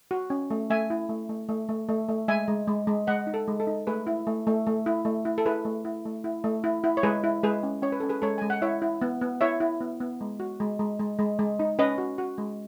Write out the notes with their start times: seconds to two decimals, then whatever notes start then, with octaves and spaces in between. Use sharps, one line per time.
0.11 F#4
0.30 C#4
0.50 A3
0.70 A3 E5 G#5
0.90 E4
1.09 A3
1.29 A3
1.49 A3
1.69 A3
1.89 A3
2.09 A3
2.28 G#3 E5 G#5
2.48 G#3
2.67 G#3
2.87 G#3
3.07 G#3 D#5 F#5
3.27 D#4
3.34 A4
3.48 G#3
3.60 A4
3.67 D#4
3.87 A3 G#4 B4
4.07 E4
4.27 A3
4.47 A3
4.67 A3
4.86 E4
5.05 A3
5.25 E4
5.38 A4
5.46 E4 G#4 B4
5.65 A3
5.85 E4
6.05 A3
6.24 E4
6.44 A3
6.64 E4
6.84 E4
6.97 C#5
7.03 G#3 G#4 B4
7.24 E4
7.43 G#3 G#4 B4
7.63 C#4
7.82 C#4 C#5
7.92 B4
8.00 C#4 A4
8.09 G#4 B4
8.22 G#3 A4 C#5
8.38 G#3 G#5
8.50 F#5
8.62 E4 C#5 E5
8.82 E4
9.02 B3
9.21 B3
9.41 E4 C#5 E5
9.60 E4
9.80 B3
10.00 B3
10.21 G#3
10.40 F#4
10.60 G#3
10.79 G#3
11.00 G#3
11.19 G#3
11.39 G#3
11.59 D#4
11.79 C#4 B4 D#5
11.98 F#4
12.18 F#4
12.38 G#3